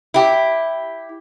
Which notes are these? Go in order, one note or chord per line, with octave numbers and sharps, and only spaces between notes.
E4 G4